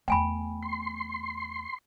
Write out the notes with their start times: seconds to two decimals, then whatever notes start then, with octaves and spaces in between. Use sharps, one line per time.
0.08 E2 A3 G5 G#5 B5
0.63 C6